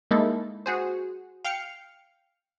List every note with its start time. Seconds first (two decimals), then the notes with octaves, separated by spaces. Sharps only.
0.11 G#3 A#3 D#4 E4 A4
0.66 F#4 G#4 C5
1.45 F5 G5 F6 C7 C#7